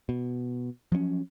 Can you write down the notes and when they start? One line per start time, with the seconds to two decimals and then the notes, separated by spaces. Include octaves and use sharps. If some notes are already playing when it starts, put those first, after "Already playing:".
0.09 B2
0.92 F3 F#3 B3 C#4